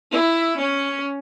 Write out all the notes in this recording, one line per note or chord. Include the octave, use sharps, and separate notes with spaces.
E4
C#4